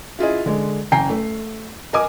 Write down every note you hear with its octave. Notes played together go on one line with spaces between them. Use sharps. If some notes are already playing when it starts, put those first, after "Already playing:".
E4 F4 G#4 D#5
D3 G#3
F#1 G5 G#5 A#5 C7
A3
A#4 D#5 G#5 D6